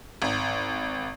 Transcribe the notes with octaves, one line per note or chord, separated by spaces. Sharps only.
G#1